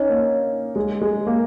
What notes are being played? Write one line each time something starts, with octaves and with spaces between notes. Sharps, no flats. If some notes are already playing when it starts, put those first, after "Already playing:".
Already playing: C#4 D#4
A#3
G#3
G#3
A#3